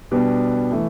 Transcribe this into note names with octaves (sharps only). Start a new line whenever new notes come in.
B2 G3 B3 D4
E3 A3